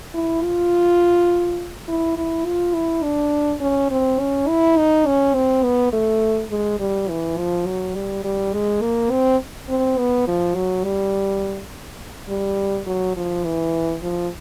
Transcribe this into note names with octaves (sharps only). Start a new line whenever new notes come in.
E4
F4
E4
E4
F4
E4
D4
C#4
C4
C#4
E4
D#4
C#4
C4
B3
A3
G#3
G3
E3
F3
F#3
G3
G3
G#3
A#3
C4
C4
B3
F3
F#3
G3
G3
F#3
F3
E3
F3